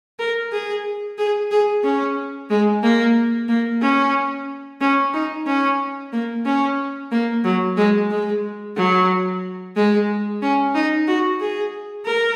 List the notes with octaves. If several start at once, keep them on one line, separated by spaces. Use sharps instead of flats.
A#4
G#4
G#4
G#4
C#4
G#3
A#3
A#3
C#4
C#4
D#4
C#4
A#3
C#4
A#3
F#3
G#3
G#3
F#3
G#3
C#4
D#4
F#4
G#4
A#4